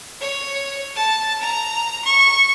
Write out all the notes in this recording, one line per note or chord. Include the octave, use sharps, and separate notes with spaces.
C#5
A5
A#5
C#6